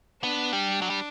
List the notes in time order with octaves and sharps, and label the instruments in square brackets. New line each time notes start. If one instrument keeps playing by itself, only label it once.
[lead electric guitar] B3 [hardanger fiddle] D4
[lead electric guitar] G3
F#3
G3